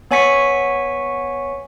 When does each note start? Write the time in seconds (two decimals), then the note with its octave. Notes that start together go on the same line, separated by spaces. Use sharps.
0.11 B3 C#5 G#5 C#6 B6 C#7